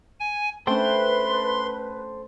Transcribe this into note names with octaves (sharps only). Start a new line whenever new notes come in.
G#5
A3 C#4 D4 A4 B4 C5 G5 C6